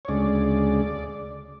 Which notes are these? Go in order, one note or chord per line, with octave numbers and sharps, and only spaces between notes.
C#5
D2 C#3 G#3 D5